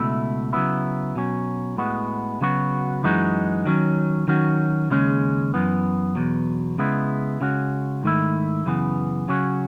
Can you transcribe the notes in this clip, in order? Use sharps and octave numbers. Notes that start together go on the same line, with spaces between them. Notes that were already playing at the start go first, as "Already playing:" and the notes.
Already playing: C#2 B2 A3 E4
C#3 F#3 B3 E4
B2 F#3 C#4
A2 G#3 B3 F#4
C#3 F#3 B3 F#4
F#2 E3 G#3 D#4 F#4
D#3 F#3 C#4
D#3 F#3 C#4 F#4
D#2 C#3 G#3 C#4
F#2 E3 B3
E2 B2 F#3
C#3 G#3 B3 E4
C#3 G#3 C#4 F#4
G#2 D#3 A3 E4
F#2 C#3 E3 B3
C#3 F#3 C#4 F#4